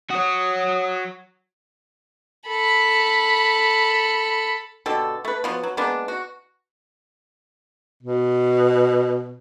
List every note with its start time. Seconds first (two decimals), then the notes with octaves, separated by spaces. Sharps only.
0.10 F#4 C#5 D#6
2.48 A4 B5
4.86 B2 D3 G4 A4
5.25 A3 B4
5.44 F3 F#3 B3
5.64 F#3
5.77 G#3 A#3 B3 D4
6.08 F#4
8.03 B2